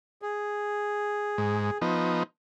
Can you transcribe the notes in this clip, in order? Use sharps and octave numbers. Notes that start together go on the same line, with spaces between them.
G#4
G#2
F3 B3 D#4